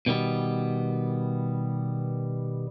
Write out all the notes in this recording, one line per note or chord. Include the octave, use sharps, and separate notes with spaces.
B2 D#3 G3 B3